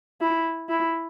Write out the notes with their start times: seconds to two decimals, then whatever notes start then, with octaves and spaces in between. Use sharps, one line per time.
0.21 E4
0.69 E4